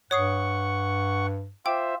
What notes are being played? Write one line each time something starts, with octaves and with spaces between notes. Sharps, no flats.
G2 C#5 F#5 C#6 D#6 C7
F4 C5 E5 G5 D6